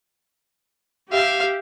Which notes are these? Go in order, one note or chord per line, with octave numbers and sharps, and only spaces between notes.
G4 E5 F5